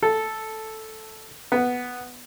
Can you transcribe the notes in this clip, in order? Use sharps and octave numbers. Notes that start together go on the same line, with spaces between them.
A4
B3